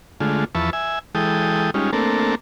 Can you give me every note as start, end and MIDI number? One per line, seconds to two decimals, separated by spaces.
0.20 0.45 50
0.20 0.45 56
0.20 0.45 57
0.20 0.45 65
0.55 0.70 40
0.55 0.70 53
0.55 0.70 71
0.55 0.70 76
0.55 0.70 81
0.55 0.70 85
0.73 0.99 76
0.73 0.99 80
1.15 1.70 52
1.15 1.70 56
1.15 1.70 69
1.15 1.70 79
1.15 1.70 87
1.74 1.91 55
1.74 1.91 56
1.74 1.91 61
1.74 1.91 63
1.74 1.91 65
1.93 2.35 57
1.93 2.35 58
1.93 2.35 60
1.93 2.35 62
1.93 2.35 69
1.93 2.35 70